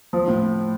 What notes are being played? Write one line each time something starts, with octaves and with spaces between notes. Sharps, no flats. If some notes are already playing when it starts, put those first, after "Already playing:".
F3
A2